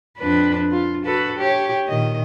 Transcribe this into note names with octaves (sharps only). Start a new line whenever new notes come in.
F2 D4 B4
F4
F#4 A4 B4
G4 C#5
A#2 D#3 D#5